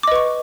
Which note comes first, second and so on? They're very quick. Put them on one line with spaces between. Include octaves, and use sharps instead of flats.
D6 D#5 B4 C#6